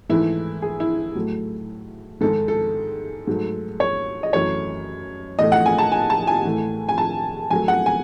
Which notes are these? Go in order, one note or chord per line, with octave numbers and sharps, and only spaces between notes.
G#2 E3 A3 E4
G#4
E4
A2 F#3 A3
G#2 D#3 G#3 A4
A4
G#2 F#3 A3
C#5
D#5
F#2 E3 A3 C#5
A2 E3 A3 D#5
F#5
G#5
A5
G#5
A5
G#5
A2 E3 A3
G#5
A5
G#2 D#3 F#3 A3 G#5
F#5
G#5